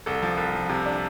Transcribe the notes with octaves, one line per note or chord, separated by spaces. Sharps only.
C2 A4
F3
C2
F3
C3
D4